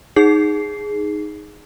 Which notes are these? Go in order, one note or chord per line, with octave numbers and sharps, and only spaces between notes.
D#4 G#4 C7